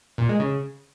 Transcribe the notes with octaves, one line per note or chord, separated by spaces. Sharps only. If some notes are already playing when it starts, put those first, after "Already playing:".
A#2
G#3
C#3